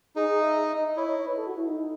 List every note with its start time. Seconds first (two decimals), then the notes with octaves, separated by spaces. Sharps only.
0.16 D#4 G#4
0.29 G#4
0.42 E5
0.56 E5
0.66 E5
0.76 D#5
0.87 D#5
0.97 E4 C#5
1.07 D#5
1.17 C#5
1.27 B4
1.37 A4
1.47 F#4
1.57 E4
1.67 D#4